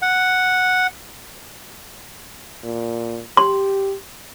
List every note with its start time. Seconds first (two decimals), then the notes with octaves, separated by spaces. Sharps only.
0.02 F#5
2.63 A#2
3.37 G4 C6